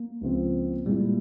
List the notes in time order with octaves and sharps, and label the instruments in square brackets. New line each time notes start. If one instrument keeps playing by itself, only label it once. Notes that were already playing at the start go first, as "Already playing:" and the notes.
Already playing: [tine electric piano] A#3
[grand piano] C#2 C#3 F3 C4
[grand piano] A#2 G#3 E4 [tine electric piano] G3